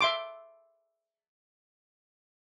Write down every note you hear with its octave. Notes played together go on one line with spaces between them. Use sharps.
E5 C6 D6